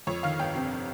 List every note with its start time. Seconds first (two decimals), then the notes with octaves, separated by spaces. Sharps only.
0.07 F2 C#5
0.23 D#3 F5
0.39 G1 G5
0.55 C3